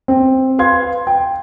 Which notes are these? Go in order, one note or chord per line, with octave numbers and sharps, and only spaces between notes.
C4
B4 F5 C6 G#6
G5